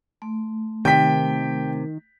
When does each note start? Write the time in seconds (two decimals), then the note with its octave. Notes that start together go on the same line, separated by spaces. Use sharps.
0.22 A3
0.85 C3 D#3 G5 B6